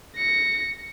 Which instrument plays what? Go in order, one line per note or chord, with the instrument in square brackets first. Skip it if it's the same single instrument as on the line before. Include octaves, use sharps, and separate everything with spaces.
[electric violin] A#6 C#7